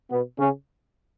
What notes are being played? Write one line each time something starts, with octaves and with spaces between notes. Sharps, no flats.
B2 B3
C#3 C#4